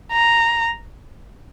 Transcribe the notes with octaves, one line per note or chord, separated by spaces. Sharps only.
A#5